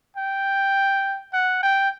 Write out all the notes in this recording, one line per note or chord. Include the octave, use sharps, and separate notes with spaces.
G5
F#5
G5